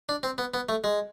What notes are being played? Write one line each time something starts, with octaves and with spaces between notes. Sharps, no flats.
D4
C4
B3
B3
A3
G#3